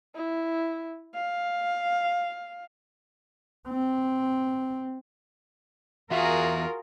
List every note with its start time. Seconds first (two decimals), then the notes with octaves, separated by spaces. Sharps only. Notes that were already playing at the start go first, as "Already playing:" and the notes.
0.15 E4
1.15 F5
3.69 C4
6.11 E2 F4 F#4 G#4 A#4 E5